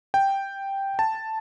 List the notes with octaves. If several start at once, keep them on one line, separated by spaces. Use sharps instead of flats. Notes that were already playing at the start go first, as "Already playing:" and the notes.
G5
A5